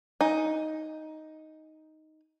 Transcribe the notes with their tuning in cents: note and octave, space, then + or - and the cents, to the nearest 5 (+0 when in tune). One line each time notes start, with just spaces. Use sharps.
D#4 +5 G#5 +0